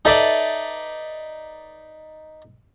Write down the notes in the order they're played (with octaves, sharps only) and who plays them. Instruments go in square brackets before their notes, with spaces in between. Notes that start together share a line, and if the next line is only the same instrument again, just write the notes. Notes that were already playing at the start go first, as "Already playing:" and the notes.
[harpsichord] D#4 B4 D5 [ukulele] A4 E5